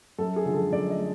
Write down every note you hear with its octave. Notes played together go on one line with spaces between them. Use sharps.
F#2 A4
G#4
D3 F3 G#3
A4
F#2 D5
D#5
G#3